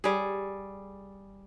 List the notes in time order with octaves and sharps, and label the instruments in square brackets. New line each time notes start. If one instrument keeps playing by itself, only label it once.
[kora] G3 G#4